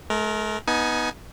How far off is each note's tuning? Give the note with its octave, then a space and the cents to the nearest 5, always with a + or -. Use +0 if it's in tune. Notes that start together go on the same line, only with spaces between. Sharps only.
A3 -45 A#4 +0
B3 -10 D#4 +15 G#5 +20